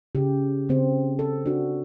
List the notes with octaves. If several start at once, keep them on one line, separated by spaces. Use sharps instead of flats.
C#3 G4
C#3 C4
A4
D4 F#4